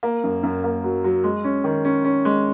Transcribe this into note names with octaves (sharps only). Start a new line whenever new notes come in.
A#3
F#2
F#2
A#3
F#3
F#3
G#3
C#4
D#3
C#4
C#4
G#3